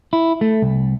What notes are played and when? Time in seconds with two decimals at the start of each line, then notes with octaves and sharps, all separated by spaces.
0.13 E4
0.41 A3
0.62 C2